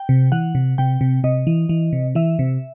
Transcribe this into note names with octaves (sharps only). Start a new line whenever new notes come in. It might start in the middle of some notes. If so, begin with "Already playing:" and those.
Already playing: G5
C3
E3 F#5
C3
C3 G5
C3
C3 D#5
E3
E3
C3
E3 E5
C3